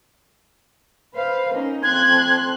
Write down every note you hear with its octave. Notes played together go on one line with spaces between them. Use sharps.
B4 C5 F5
A#3 C#4 D#4
F2 C6 F#6 G#6